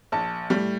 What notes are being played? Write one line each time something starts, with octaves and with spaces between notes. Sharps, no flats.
A#1 A5
A2 G3